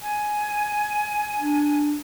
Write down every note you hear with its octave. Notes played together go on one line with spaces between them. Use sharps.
G#5
D4